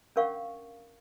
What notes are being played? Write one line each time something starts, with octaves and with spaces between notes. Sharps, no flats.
C#4 D4 A#4 F5 F#5 C#6